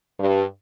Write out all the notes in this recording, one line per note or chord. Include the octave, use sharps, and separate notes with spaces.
G2